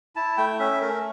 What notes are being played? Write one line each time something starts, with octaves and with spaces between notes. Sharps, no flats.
E4 A5
A3 G5
C#4 E5
A3 A#4